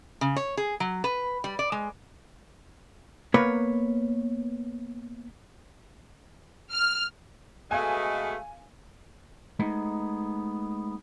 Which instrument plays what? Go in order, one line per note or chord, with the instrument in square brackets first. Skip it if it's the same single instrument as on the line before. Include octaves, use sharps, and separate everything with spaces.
[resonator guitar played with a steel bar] C#3
C#5
G#4
F#3
B4
G3
D5
G#3
[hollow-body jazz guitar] A#3 B3 A#4 B4 C#5
[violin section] F6
[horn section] B2 G#3 A3 [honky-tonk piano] F5 G#5
[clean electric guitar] G#3 A3 B3 D#4